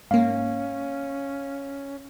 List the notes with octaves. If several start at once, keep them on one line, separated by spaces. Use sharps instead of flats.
G#2 A#3 C#4 F5